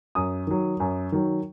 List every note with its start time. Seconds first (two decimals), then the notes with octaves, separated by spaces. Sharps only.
0.15 F#2 D#6
0.47 D#3 F#3
0.80 F#2
1.12 D#3 F#3